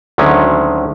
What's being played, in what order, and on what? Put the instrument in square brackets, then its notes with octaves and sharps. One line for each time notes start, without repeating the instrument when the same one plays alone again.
[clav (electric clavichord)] D2 D3 D#3 F#3 G#3 C#4